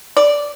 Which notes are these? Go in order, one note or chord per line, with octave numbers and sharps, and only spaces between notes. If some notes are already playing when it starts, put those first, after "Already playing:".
D5